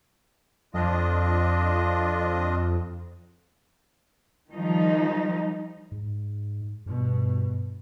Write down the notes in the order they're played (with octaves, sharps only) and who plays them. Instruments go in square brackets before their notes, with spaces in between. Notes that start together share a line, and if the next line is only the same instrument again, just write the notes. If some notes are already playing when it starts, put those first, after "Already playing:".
[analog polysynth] F2 [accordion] D4 F4 D#5
[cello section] D#3 F3 G3 D#4
[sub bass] G#2
[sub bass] G2 [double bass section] B2